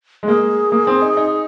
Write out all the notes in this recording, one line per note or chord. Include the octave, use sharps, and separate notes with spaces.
G#3
A#3 G#4
A#3
C4
D#4
D#4